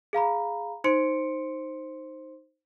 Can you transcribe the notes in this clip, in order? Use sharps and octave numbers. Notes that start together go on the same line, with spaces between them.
G#4 F5 A#5 B5
D#4 C5 C6 C#7 D7